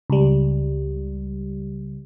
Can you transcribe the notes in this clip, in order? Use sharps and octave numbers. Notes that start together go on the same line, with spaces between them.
C#2 G3